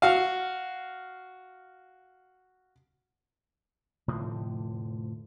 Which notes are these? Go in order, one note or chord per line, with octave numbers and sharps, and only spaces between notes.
F#4 F5
F1 A2 D3 F3